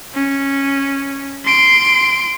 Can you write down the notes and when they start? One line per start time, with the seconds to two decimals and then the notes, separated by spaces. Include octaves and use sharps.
0.14 C#4
1.45 C6 D7